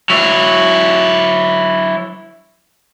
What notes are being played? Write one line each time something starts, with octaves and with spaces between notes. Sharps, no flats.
F#3 E4